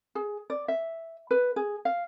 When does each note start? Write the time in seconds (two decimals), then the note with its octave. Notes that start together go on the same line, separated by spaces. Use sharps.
0.15 G#4
0.50 D5
0.68 E5
1.31 B4
1.56 G#4
1.85 F5